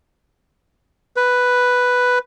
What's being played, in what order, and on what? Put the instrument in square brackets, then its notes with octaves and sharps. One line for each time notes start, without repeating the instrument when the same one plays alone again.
[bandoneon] B4